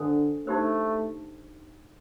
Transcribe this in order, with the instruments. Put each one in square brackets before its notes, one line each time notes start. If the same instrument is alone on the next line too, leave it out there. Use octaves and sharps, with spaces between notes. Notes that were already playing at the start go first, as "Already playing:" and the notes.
Already playing: [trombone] D3 [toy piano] D4 A4 C5
[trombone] A3 [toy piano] D#4 G4 C5